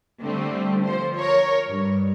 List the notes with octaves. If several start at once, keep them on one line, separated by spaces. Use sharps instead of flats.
D3 G3 A3 C4
F3 C5
A#4 C#5
G2